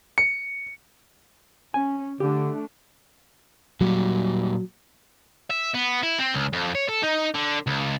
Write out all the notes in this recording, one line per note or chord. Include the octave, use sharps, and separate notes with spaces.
C#7
C#4 G#5
D3 A3 D4 G4
A#2 F#3 G3
E5
B3
E4
C4
C#2
F2
C#5
A4
D#4
D3
C#2